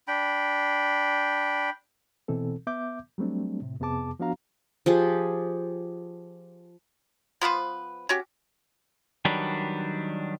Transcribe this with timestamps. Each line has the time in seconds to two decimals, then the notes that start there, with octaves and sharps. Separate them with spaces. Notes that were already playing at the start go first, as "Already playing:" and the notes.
0.08 D4 G5 B5
2.28 B2 E3 C4 A4
2.67 B3 E5 D6 G6
3.18 F#3 G3 A3 C4 D4
3.62 A2 C3
3.80 F2 C3 B3 G#4 A5 D6
4.20 F3 B3 D4 F#4 F5 A#5
4.86 F3 G4 G#4
7.41 F3 B3 B4 C5
8.09 C#4 F#4 G4
9.25 D#3 F#3 G3 D4 B4